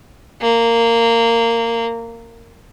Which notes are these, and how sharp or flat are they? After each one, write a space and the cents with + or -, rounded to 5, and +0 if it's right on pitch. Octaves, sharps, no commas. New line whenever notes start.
A#3 -15